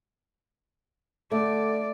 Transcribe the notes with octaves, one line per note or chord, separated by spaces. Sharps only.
D3 A3 D5